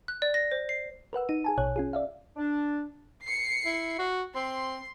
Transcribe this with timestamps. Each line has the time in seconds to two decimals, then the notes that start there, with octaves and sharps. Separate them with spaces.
0.08 F#6
0.22 D5
0.34 A#6
0.51 C5
0.69 C7
1.13 A#4 B4 F#5 E6
1.29 D#4 D#7
1.44 G#4 G#5 A5
1.58 A#1 B2 C#5 F#6
1.76 C#4 F4 G#4
1.93 D5 E5 F5
2.37 D4
3.23 C7 C#7
3.65 E4
3.99 F#4
4.35 C4 C6